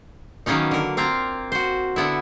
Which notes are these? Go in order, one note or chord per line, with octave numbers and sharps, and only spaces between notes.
D#3 F#3 A#3 B3 C#4 D#4
D3 A#4
A#3 C4 F4 A#5
F#4 C5
D3 B3 E4